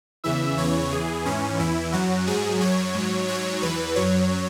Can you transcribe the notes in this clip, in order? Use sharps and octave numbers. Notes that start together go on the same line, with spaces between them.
E2 C#3 E3 E5
E2 C#3 E3 C#5
E2 E3 G#4
G#2 E3 C#4
E2 E3 E4
F#2 F#3 F#4
G#2 F#3 G#4
F#2 F#3 C#5
G#2 F#3
G#2 F#3 C#5
E2 E3 B4
F#2 F#3 C#5